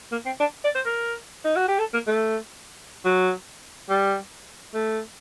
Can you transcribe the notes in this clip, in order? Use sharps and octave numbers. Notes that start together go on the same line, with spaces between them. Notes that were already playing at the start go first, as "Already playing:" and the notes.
A#3
C4
D4
D5
C5
A#4
D#4
F#4
G4
A4
A#3
A3
F#3
G3
A3